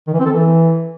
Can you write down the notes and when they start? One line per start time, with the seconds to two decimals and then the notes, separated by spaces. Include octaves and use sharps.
0.07 D#3
0.13 E3
0.20 C4
0.26 A4
0.32 E3